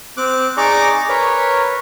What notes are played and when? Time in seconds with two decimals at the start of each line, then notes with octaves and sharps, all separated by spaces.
0.17 C4 D6 F#6
0.57 D#4 G#4 D5 A#5 C#6 D6
1.09 A#4 B4 C#5